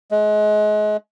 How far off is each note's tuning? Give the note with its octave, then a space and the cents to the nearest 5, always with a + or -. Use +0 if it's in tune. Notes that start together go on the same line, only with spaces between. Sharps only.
G#3 +30